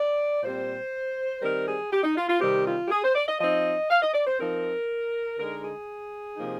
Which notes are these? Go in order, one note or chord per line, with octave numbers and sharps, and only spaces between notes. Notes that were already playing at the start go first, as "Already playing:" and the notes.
Already playing: D5
A#2 G3 C4 C5
D#3 G3 C4 A#4
G#4
G4
D#4
F4
F4
C3 D#3 G3 C4 G4
F4
G4
G#4
C5
D5
D#5
F3 C4 D#4 D#5
F5
D#5
D5
C5
F3 C4 D#4 A#4
D3 G#3 D#4 A#4
G#4
C3 F3 A#3 D#4